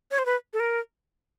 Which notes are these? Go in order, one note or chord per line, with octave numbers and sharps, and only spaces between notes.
C#5
C5
B4
A4
A#4